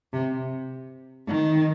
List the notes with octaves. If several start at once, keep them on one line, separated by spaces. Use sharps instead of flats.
C3
D#3